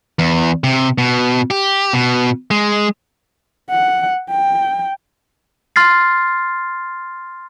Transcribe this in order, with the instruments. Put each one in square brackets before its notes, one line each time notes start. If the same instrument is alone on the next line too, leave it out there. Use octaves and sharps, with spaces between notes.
[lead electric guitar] E2
C3
B2
G4
B2
G#3
[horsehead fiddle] F#5
G5
[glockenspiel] C6 F6 A6 C7